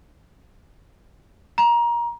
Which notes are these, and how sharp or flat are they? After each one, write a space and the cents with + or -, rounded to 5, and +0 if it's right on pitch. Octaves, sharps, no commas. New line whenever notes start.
A#5 +20